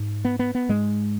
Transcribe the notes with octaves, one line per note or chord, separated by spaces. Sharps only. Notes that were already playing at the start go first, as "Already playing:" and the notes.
Already playing: G#2
B3
B3
B3
G#2 G#3